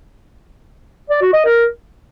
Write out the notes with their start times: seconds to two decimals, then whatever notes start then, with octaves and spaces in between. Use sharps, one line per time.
1.10 D5
1.22 F#4
1.33 D#5
1.45 A#4